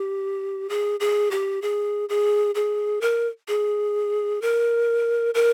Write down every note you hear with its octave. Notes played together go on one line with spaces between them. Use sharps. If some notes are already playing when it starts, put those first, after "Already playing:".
Already playing: G4
G#4
G#4
G4
G#4
G#4
G#4
A#4
G#4
A#4
A#4